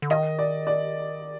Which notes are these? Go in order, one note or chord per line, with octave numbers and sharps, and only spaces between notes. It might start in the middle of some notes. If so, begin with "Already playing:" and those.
D3
D#3 D#5
D5
D5